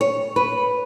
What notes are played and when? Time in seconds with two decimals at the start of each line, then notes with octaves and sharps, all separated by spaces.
0.01 C#5
0.36 B4